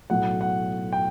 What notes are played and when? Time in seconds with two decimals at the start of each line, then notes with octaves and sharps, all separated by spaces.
0.10 B1 A2 F#3 F#5
0.41 F#5
0.93 G5